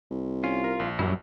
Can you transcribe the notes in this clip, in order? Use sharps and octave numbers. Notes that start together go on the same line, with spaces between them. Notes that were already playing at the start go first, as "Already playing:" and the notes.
C2
C#4 F4
A#4
A#1
F#2 F#3 G3 E4